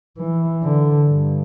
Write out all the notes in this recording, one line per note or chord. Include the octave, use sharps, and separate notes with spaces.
E3
D3
G2